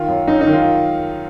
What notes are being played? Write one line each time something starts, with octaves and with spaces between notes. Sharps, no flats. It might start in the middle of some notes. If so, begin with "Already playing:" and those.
Already playing: D#3 F4
F#2
F#2 D#4
D#4
D#3
F4